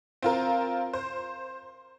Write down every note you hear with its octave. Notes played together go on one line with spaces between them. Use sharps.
C4 F4 A#4
C5